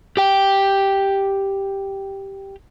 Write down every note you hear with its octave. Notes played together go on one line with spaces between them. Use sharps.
G4 G5